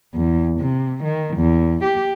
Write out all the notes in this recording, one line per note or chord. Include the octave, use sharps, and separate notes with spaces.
E2
C3
D#3
E2
G4